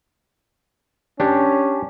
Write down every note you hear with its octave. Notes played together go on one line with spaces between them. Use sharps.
C#4 D4 G4 C#5